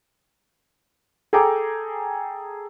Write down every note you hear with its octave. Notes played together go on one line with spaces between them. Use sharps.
G#4 A4 G5 A#5 D6